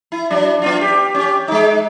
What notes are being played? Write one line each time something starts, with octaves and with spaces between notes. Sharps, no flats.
E4
F#3 D4
B3 D4 F4
G4
C#4 G4
G#3 D#4